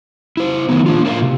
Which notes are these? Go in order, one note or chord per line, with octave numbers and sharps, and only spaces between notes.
E4 C5
D#3 F#3 B3 D#4
A#3 D4 F4
F4 A#4 C5 D5 E5 F5
C3